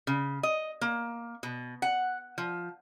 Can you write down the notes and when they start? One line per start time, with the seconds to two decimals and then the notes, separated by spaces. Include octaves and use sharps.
0.07 C#3
0.43 D#5
0.81 A#3
1.43 B2
1.82 F#5
2.38 F3